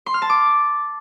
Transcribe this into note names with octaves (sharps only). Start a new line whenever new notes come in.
C6
F6
A5
D6